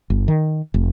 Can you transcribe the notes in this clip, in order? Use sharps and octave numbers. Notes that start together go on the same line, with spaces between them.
G1
D#3
F1